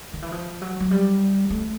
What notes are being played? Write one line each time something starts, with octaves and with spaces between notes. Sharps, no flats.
D#3
E3
F3
F#3
F#3
G3
A3